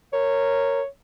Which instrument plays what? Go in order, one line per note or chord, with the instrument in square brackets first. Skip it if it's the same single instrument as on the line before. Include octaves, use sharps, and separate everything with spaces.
[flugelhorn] A#4 [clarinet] C#5